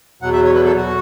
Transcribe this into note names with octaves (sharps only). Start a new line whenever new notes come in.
E2 B2 F#3 F#5
E5
C#5
B4
A4
F#4